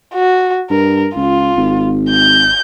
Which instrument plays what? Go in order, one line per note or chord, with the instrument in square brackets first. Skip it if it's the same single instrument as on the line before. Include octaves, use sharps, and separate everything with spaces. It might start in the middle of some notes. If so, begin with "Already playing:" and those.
[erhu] F#4
[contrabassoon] G2 [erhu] A#4
[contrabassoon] C#2 [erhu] F4
[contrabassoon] G#1
[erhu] G6